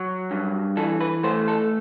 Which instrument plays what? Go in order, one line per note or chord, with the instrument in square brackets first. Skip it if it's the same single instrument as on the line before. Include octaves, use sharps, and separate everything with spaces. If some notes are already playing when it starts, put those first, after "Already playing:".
Already playing: [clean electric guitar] F#3
G2
E3 A4
B4
A3 C5
A4